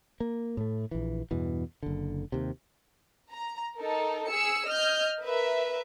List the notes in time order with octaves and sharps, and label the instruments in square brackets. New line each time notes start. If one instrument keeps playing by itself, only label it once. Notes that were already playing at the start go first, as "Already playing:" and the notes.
[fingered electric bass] A#3
A2 A3
A#1 E3
E2 G2 B2 E3
F#1 D3
D#2 C3
[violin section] A#5
D#4 A4 A#4
G#4 E6 C#7
D#5 F6 G6
A#4 B4 E5